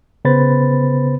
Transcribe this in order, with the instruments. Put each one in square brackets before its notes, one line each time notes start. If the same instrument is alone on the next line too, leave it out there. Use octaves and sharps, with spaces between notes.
[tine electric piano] C#3 B3 B4 C5 B5 A6